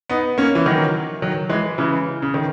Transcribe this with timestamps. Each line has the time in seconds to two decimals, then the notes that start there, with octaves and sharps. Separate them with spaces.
0.09 B3 D#4
0.38 A#3 C#4
0.55 E3
0.66 D#3 F#3
1.22 D#3 F#3
1.49 E3 G#3
1.78 C#3 E3
2.22 C#3
2.34 D#3